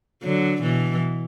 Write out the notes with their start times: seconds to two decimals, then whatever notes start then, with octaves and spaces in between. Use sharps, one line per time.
0.23 D3 F#3
0.63 B2 E3